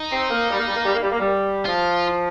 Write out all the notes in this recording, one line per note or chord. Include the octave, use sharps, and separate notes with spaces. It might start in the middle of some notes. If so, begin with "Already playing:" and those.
Already playing: D#4
C4
A#3
G3
A#3
G3
A#3
G3
A#3
G3
A#3
G3
F3 F4